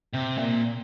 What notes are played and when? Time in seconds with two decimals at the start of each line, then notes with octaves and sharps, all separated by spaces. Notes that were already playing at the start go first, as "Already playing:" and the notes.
0.14 C3
0.37 A#2